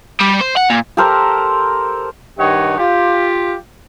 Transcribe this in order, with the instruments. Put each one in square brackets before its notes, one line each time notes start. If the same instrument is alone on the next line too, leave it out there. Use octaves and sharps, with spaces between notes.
[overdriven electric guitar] G3
C5
F#5
A#2
[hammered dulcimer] G4 A4 A#4 C5
[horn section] G2 D#3 G4 C#5 D#5 F#5
F4 G4